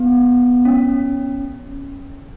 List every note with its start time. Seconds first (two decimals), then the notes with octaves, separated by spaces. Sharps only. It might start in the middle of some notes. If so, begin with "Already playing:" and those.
Already playing: B3
0.65 C#4